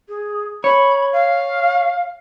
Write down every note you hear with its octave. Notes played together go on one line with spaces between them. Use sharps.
G#4
C#5 B5
F5